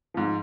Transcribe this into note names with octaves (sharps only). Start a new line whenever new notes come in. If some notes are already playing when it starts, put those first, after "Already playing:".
G#2 F3